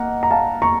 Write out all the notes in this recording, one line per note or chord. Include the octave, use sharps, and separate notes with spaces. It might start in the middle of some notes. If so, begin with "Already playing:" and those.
Already playing: A#3 D#5 F#5 A#5
A#5
F5 A5
A#5 C#6